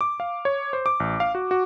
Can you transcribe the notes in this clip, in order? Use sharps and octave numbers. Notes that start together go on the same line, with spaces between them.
D6
F5
C#5
C5
D6
A1
F5
F#4
F#4